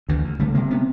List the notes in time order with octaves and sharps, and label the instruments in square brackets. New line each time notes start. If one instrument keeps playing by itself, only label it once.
[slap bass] D2 D3 E3
D2
D3 G3 A3
C3 G#3 A#3
B3 C#4